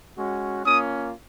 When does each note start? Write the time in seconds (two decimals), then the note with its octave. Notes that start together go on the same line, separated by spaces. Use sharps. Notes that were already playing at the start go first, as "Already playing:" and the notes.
0.17 G#3 C#4 F#4
0.65 A#3 C#4 F4 D#6